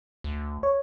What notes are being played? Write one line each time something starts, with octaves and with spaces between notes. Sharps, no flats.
D2
C#5